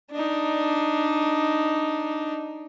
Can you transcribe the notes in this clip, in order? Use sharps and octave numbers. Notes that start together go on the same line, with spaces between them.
D4 D#4